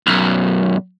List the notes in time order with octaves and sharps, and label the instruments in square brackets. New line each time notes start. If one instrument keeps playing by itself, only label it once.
[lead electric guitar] B1 F#2